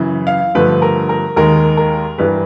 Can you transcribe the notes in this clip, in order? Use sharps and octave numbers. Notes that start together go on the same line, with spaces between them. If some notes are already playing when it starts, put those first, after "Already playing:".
Already playing: F#2 C#3 E3
F5
G2 D3 F3 A3 B4
A#4
A#4
D#2 D#3 G#3 A#4
A#4
G2 E3 G3 B4